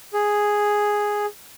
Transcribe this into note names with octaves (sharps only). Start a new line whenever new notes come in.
G#4